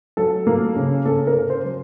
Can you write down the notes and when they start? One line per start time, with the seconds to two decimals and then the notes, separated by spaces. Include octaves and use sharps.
0.17 F#3 A4
0.47 A#3
0.76 C#3
1.06 A#3 A4
1.27 A#4
1.35 C#3
1.50 C5
1.65 F#3